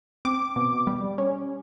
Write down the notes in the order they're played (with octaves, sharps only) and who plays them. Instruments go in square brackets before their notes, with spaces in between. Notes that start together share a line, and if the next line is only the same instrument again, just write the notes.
[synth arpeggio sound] C4 D6
B2
G3
C#4